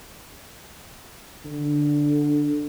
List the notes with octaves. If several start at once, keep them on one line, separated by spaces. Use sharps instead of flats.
D3